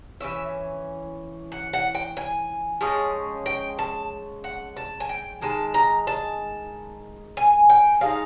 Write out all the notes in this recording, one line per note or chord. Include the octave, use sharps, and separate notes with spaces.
E3 G#3 C#4 E5
F#5
F#5
G5
G#5
F3 G#3 C#4
G5
A5
F#5
A5
G#5
G5
D#3 G#3 A5
A#5
A5
G#5
G5
F3 G#3 D#4 F5